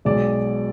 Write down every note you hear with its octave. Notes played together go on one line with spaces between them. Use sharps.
B1 B2 G#3 D5